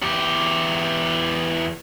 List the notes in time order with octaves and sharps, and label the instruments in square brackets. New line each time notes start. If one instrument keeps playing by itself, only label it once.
[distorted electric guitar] E2 G4